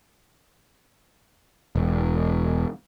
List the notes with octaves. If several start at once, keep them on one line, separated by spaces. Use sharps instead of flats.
E1